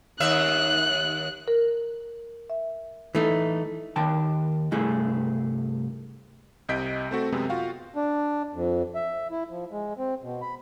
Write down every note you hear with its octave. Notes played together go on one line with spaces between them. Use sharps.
D#2 E5 F#6
A#4
E5
E3 A3 D#4
D#2 D#3 G5 A5
C2 G2 A3 E4 G#4
C2 C3 D#5 G6 B6 D7
A3 C4 F#4 A4
F#2 C3 G#3 B3 C4
F4 F#4 F5 G5
D4
F2
E5
E4
F3
G#3
C4
B2
B5